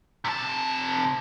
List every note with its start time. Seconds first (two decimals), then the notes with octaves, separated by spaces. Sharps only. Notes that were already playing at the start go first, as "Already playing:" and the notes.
0.24 C3 A5